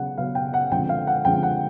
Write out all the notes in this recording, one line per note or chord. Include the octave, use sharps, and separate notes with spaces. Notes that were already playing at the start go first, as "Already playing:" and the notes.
Already playing: C#3 F#3 B3 F#5
C#3 F#3 B3 F5
G5
F#5
D3 F3 G#3 C4 G5
F5
F#5
D3 F3 G#3 C4 G5
F#5